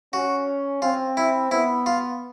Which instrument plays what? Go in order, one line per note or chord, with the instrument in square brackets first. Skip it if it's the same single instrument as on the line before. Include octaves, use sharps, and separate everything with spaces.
[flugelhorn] C#4 [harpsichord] F#4
[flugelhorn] C4 [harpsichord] F4
[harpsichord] E4
[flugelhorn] B3 [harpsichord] E4
[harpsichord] F4